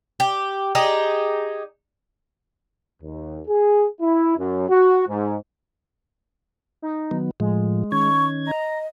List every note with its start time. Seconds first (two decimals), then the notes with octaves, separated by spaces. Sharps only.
0.20 G4
0.75 D#4 G4 G#4
3.03 D#2
3.48 G#4
4.01 E4
4.38 F#2
4.70 F#4
5.08 G#2
6.82 D#4
7.11 D#3 F#3 B3
7.40 A2 F3 G#3
7.92 D#3 C#4 C#6 G#6
8.47 D#5 A#5